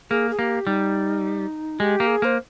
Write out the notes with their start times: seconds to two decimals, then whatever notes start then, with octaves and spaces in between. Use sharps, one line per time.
0.10 A#3 G#4
0.31 G#4
0.39 A#3 G4
0.67 G3 D#4
1.80 G#3 G4
2.00 A#3
2.07 G#4
2.22 A#3 C5